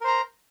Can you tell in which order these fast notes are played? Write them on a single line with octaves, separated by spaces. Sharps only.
A#4 C5 A#5